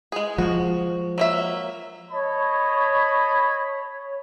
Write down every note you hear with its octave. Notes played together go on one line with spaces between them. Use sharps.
G#3 G#4
F3 G#3 F#4
F#3 A#3 E5
C#5 D#5 A5 B5